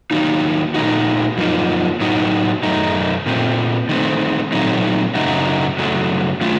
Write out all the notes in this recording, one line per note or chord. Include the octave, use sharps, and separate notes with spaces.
D#3 F#3 A#3 D#4
A#2 A3 D#4 F#4
F#2 F3 A#3 D#4
A2 F#3 A3 D#4 F#4
F#2 D#3 A3 D#4
A#2 A3 C4
D#3 A3 C4
A#2 F#3 A3 C4 D#4
F#2 C#3 A3 D#4 F#4
F#2 C#3 F#3 A3
D#3 A3 C#4 F4